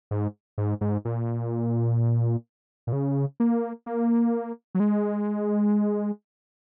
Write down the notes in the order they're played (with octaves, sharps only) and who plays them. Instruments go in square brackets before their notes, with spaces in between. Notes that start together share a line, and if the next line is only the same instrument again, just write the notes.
[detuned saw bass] G#2
G#2
G#2
A#2
A#2
C#3
A#3
A#3
F#3
G#3